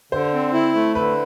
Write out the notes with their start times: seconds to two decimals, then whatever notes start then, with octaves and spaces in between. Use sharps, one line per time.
0.12 D3 C5
0.33 C4
0.53 E4
0.74 A3
0.95 D3 B4